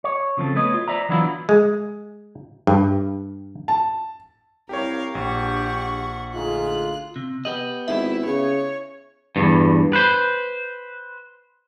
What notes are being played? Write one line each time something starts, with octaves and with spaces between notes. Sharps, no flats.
C#5
C#3 F3 C4 A4
A3 B3 C#5 D#5
F4
C5 D5 E5 A#5
E3 F#3 B3 D4 E4 F4
G#3
G2
A5
C2 G4 A#4 C#5 F5
A#1 D4 G4 F#5 C#6
D2 D#4 F4 G#4 F#6
C3
B3 G4 D#5 F#7
G#1 E4 E5
C#3 C#5
E2 G2
B4 C5